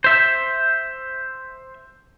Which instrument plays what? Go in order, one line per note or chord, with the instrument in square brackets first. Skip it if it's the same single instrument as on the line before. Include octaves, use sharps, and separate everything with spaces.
[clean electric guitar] C5 E5